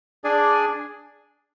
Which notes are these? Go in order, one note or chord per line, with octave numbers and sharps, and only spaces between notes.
D4 G#4 D5 G#5